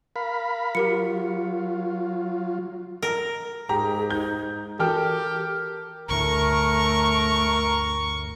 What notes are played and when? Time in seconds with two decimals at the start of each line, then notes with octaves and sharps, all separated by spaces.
0.16 A#4 F5 B5
0.75 F#3 F4 G4 A#4 C#7
3.02 A#4
3.69 G#2 G4 G#4 A#5
4.10 D#4 G6
4.79 E3 F#4 G4 A4 A#4 G5 F6
6.09 G1 D2 A2 A3 A#4 C#6